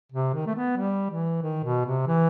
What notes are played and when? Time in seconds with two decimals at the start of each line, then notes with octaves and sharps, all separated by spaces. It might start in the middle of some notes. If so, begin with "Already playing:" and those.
0.12 C3
0.34 D#3
0.47 A3
0.55 B3
0.77 G3
1.10 E3
1.42 D#3
1.64 B2
1.86 C3
2.07 E3